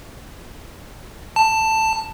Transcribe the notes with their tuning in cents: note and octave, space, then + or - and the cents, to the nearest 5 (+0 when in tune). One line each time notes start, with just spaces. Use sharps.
A5 +10